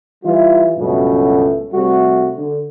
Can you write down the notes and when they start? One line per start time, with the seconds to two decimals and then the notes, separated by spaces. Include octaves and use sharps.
0.24 E3 G3 F4
0.78 C#2 G2 B2 F#3 A3 C#4
1.73 C3 G3 A3 F#4
2.37 D3